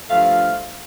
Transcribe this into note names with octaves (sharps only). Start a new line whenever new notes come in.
G2 F3 A3 F5